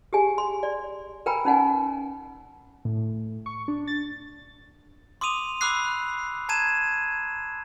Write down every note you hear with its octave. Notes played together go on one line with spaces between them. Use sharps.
G4 G#4 G#5
C6
D5
A#4 B4 G5 G#5 A#5 B5
C#4 D#4 F#5 G#5
A2
C#6
D4
A6
C6 D6 D#6 D#7 F7
B5 D6 E6 F#6 C7
A5 A#5 G#6 D#7 E7